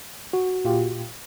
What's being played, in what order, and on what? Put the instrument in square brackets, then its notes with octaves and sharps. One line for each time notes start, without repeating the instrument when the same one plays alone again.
[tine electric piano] F#4
[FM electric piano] A#2 F4 G4